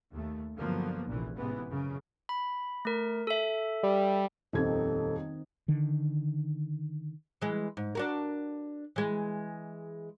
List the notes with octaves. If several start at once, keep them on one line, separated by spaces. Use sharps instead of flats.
D#2 A3
G2 D3 F3 F#3 A#3 B3
F1 A#1 A#2 E3
A1 G#2 C3 E3 B3
F#2 C#3
B5
A3 A#4
A4 E5
G3
D#1 F2 D#3 C4 D#4 A4 G#6
D3 D#3
E3 G#3
G#2
D4 F#4 A#4
E3 G#3